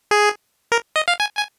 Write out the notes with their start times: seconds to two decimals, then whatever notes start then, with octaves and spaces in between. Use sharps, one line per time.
0.11 G#4
0.72 A#4
0.96 D#5
1.08 F5
1.20 G#5
1.37 G#5